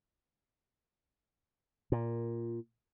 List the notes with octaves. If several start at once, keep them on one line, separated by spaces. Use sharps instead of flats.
A#2